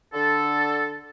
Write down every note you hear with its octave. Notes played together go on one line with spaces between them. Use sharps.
D3 A4